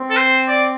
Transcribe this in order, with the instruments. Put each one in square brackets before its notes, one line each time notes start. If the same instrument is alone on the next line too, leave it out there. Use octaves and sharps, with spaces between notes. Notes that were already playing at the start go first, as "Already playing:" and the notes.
Already playing: [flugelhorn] C4
[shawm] A4
C5
D5